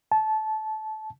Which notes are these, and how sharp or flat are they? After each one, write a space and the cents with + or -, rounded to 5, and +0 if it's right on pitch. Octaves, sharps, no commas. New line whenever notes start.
A5 -20